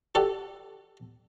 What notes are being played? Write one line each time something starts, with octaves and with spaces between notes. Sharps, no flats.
F#4 G4 A4 D5 A5